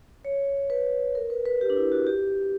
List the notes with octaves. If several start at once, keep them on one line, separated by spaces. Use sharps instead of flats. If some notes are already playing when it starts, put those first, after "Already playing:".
C#5
B4
A#4
B4
B4
G4
D4
E4
F#4
G4